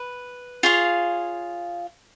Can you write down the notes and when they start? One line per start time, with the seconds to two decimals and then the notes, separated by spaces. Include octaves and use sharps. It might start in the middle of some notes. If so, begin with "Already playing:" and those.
Already playing: B4
0.63 F4 G#4 C#5 F5